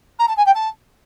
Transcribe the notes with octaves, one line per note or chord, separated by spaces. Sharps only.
A#5
A5
G#5
G5
A5